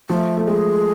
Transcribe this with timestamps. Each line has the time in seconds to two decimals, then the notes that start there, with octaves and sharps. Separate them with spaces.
0.09 F3 A3
0.37 A3
0.47 G#3 G#4